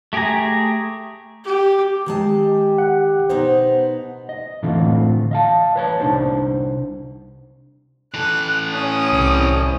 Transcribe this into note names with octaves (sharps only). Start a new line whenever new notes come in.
A3 G4 G#4 G#5 A#5
G4
D#3 G#3 G4 A5
F#5
B2 B3 D#4 C5
D#5
A2 D3 E3 A3 C4 F4
D#5 F5 A5
B4 C#5 A5
C2 D3 D4 D#4 C5
E3 A4 F#6
C#4 D#6
C2